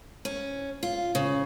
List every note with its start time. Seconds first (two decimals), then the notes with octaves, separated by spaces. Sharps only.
0.25 C#4
0.83 F4
1.15 C#3